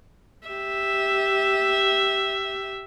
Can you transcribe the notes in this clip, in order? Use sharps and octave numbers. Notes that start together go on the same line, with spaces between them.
G4 E5